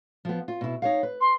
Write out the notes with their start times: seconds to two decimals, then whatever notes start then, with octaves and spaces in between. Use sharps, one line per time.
0.25 F3 B3
0.48 F4
0.61 B2 E4
0.82 D#4 C#5 F5
1.03 B4
1.21 C6